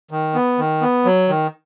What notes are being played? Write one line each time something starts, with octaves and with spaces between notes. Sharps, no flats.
D#3
B3
D#3
B3
F#3
D#3